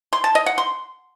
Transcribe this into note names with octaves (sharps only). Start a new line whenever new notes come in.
C6
A5
D#5
F#5
C6